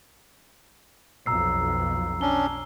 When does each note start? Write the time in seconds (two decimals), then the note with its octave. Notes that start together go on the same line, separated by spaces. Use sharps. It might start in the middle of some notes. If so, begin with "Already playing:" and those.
1.26 B1 F2 A#5 E6 C7
2.21 C#4 D4 G7